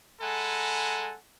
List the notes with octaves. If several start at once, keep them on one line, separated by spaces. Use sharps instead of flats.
G#3 A4 F#5 G#5 A#5 B5